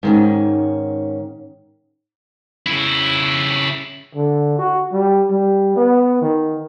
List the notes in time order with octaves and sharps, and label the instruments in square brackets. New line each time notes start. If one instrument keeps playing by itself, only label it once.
[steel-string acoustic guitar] G#2 D#3 C#4
[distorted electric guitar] C#3 E4
[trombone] D3
F#4
G3
G3
B3
D#3